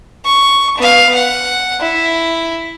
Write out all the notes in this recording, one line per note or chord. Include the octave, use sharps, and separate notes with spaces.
C#6
B3 F5
F#5
E4